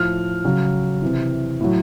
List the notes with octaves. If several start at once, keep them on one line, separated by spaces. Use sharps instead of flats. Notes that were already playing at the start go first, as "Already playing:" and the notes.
Already playing: A2 F3 F6
C#3 F#3
C3 E3
A2 F#3